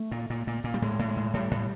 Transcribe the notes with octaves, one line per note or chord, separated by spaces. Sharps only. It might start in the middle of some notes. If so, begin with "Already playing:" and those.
Already playing: A3
A#2
A#2
A#2
A#2
G3
A2 G#3
A2
G#3
A2
A2 G3
A2